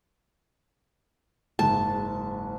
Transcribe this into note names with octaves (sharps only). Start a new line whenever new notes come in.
F#1 G#2 A5